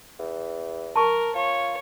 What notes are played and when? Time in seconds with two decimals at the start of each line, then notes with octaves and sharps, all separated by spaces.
0.19 E2
0.96 A#4 A5 C#6
1.35 F4 C#5